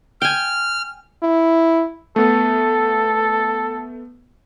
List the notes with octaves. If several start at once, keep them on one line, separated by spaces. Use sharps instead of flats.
G5 G#5 F6
E4
A3 B3 A4